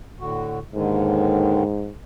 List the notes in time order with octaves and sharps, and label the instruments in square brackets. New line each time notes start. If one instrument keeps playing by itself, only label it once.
[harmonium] A2 D3 F#4
[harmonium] D#2 D3 D#3 [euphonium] G#2